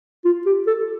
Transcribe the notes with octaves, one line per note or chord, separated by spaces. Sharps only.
F4
G4
A4